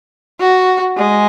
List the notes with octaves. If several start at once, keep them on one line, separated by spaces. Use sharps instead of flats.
F#4
G#3